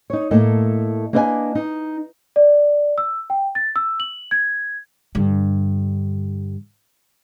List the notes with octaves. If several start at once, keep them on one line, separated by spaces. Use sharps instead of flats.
D#4 C#5
A2 A3 A#3 A4 D#5
A#3 D4 B4 D#5 F5 G#5
D#4
D5
E6
G5
A6
E6
F#7
G#6
G2 D3